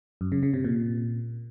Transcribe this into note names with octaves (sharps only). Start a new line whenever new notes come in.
F#2
C#3
C#3
C3
A#2